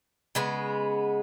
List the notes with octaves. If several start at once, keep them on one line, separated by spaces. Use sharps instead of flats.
C#3 G#3 B3